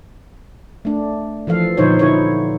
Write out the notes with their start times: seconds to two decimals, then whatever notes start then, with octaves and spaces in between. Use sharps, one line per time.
0.85 A3 D4
1.47 E3 F3 A4 F5
1.77 A#2 D3 F3 D#4 C5 C#5
1.99 D3 D#4 E4 C#5